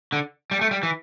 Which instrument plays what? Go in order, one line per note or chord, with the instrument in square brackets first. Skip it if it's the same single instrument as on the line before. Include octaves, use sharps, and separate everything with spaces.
[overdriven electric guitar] D3
G3
A3
G3
E3